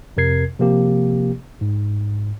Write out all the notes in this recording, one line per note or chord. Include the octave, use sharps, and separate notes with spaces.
F2 C3 A#4 G#6 C7
C3 F3 A#3 G4
G#2